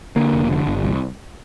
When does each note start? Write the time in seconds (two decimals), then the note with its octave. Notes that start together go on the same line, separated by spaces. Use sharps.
0.16 D3 A#3
0.33 F1
0.50 D3
0.67 G1
0.84 C2